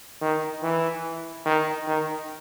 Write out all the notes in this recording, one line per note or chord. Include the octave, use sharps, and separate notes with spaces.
D#3
E3
D#3
D#3